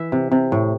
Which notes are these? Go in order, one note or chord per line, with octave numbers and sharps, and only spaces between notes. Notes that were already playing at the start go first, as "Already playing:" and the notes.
Already playing: E3 E5
C3
C3
A2